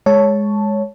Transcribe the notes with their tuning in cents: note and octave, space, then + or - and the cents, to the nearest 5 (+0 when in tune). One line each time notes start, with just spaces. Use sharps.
G#3 +0 C#5 +5 A5 +0